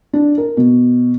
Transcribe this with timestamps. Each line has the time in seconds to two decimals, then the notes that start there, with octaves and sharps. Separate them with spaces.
0.13 D4
0.38 A#4
0.57 B2